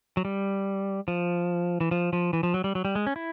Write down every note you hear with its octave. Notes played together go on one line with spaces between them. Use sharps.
F#3
G3
F3
E3
F3
F3
E3
F3
F#3
G3
F#3
G3
G#3
C#4
E4